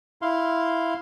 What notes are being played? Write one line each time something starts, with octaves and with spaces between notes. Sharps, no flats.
E4 F5 C6